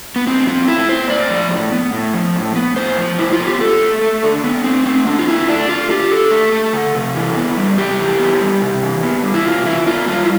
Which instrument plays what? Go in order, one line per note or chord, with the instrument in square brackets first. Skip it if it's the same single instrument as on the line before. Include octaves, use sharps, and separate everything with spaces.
[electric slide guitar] B3
A2 C4
F3 C4
A2 E4
B3 C5
A2 D5
F3
A2
B3
A2
F3
A2
B3
A2 C5
F3
A2 E4
F4
B3
G4
D3 A4
A3
A3
D3
D3 B3
A3 C4
A3 C4
D3 D4
F4
D3 E4
A3 D4
A3 F4
D3 G4
D3 A4
A3
A3
D3
C3
E3
B3
G3
C3 G4
E3
B3
G3
C3
E3
B3
G3
E4
C3 F4
E3 E4
B3 F4
G3 F4
E4